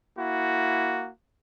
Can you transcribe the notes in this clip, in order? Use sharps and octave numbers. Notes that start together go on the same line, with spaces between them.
A#3 E4 F#4